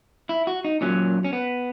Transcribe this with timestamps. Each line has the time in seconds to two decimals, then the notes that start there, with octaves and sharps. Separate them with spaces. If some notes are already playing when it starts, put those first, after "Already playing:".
0.29 E4
0.47 F#4
0.65 D#4
0.81 A#2 F#3 C#4
1.25 C#4
1.33 B3